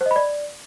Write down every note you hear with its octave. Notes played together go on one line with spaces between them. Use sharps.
C5
D#5
B5
D5